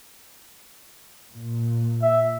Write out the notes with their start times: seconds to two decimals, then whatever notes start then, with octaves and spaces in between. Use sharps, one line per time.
1.30 A#2
2.02 E5